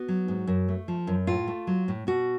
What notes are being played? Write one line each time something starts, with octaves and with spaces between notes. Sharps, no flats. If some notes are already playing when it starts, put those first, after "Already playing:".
Already playing: B3 F#4
F#3
G#2
F#2
A3
F3
F#2
A2 F4
A3
F#3
A2
B2 F#4